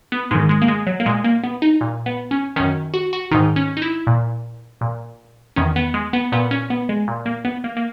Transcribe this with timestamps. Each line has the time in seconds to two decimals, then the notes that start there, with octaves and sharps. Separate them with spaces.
0.12 B3
0.31 G#2 D#3 G#3
0.49 G#3
0.62 A#3
0.68 G#3
0.87 F#3
1.00 A#3
1.06 A#2 G#3
1.24 A#3
1.44 B3
1.62 D#4
1.81 A#2
2.06 B3
2.31 C#4
2.56 F#2 D#3 C#4
2.94 F#4
3.13 F#4
3.31 G#2 D#3 D#4
3.56 C#4
3.77 D#4
3.82 E4
4.07 A#2
4.81 A#2
5.56 E2 D#3 C#4
5.76 B3
5.94 G#3
6.13 B3
6.32 A#2 B3
6.51 C#4
6.70 B3
6.89 G#3
7.08 A#2
7.26 A#3
7.45 B3
7.64 A#3
7.77 A#3